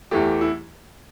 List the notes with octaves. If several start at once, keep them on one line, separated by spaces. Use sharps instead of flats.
E2 E3 A3 G4
E4